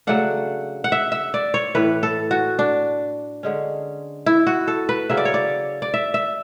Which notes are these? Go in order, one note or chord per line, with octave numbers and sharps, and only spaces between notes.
C#3 F#3 A3 D4 F#5
F#5
E5
E5
D5
C#5
A2 E3 A3 B4
A4
F#4
D4
D3 G#3 C#4
E4
F#4
A4
B4
C#3 F#3 C#4 E5
D5
C#5
D5
D5
E5
E5